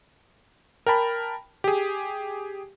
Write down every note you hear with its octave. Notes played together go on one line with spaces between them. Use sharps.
A#4 G5 A5 B5
G4 G#4